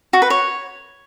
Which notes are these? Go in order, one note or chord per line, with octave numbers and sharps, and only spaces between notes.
F#4
B4
C#5